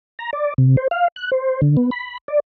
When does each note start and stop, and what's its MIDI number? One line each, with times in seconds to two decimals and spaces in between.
0.19 0.30 82
0.33 0.54 74
0.58 0.76 48
0.77 0.88 72
0.91 1.08 77
1.16 1.30 90
1.32 1.61 72
1.62 1.76 50
1.77 1.90 59
1.91 2.18 83
2.28 2.40 74